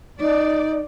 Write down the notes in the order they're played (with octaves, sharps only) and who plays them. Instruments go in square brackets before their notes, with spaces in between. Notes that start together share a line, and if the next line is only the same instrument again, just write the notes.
[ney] D#4 [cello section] D5